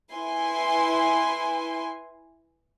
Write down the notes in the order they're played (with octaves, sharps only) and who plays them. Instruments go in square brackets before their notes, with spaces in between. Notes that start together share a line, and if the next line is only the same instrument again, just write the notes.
[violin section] E4 B4 G#5 C6